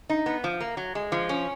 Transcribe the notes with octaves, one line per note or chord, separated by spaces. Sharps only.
D#4
B3
F3
A#3
F#3
G#3
F3
C#4